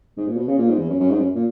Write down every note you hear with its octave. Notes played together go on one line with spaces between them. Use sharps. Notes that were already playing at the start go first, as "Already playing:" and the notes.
G#2
A#2
B2
C#3
A#2
G#2
E2
F#2
F#2
G#2
F#2
A#2